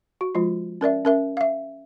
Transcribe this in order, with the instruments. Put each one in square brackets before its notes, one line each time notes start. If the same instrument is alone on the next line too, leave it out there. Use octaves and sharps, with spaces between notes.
[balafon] F#4
F3 G#3 F4
C#4 A#4 D5 E5
C#4 A#4 E5
E5 F5